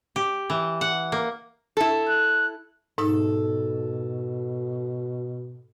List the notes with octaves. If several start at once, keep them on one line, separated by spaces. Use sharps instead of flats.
G4
E3
F#5
A#3
E4 A4
F#6
G#2 B2 D#4 A4